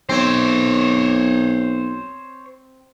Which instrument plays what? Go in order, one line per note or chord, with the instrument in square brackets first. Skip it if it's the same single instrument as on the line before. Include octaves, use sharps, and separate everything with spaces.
[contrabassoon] B1 [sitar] C4 [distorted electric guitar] C5 C#5